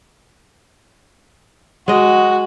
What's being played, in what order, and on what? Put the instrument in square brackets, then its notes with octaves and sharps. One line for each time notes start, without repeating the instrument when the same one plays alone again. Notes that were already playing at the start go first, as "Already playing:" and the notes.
[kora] G#3 D#5 [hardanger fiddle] F#4